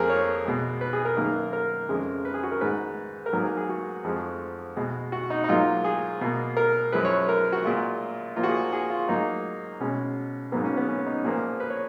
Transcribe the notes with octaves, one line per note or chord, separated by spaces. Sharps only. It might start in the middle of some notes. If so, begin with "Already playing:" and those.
Already playing: F2 F3 A#3 G#4 A#4
C#5
B2 G#3
B4
G#4
A#4
F#2 D#3 A#3
A#4
F2 C#3 F3 G#3
B4
G#4
F#4
A#4
G#2 D#3 G#3 B4
A#4
G#2 F#3 A#3 B4
G#4
A#4
G#4
F#4
F2 F3 G#3
B2 G#3
F#4
D#4
D#4
G#2 F#3 A#3 F4
G#4
B2 A#3
A#4
F#2 F3 G#3 B4
C#5
A#4
F#4
A#2 G#3 F4
A#2 F3 A#3 F4
F#4
G#4
G#4
F4
G#2 F#3 A#3 D#4
B2 G#3 C#4
G#2 F#3 A#3 B3
C#4
B3
C#4
D#4
A#2 F3 A#3 G#4
B4
C#5